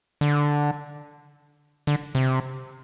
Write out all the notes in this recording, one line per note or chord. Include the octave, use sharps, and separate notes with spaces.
D3
D3
C3